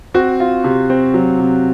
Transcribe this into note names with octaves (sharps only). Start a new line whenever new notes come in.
C4 F#4
F4
C3
C4
F#3
C3